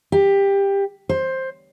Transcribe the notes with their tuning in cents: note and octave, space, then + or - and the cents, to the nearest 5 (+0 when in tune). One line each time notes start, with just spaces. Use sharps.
G4 +15
C5 +10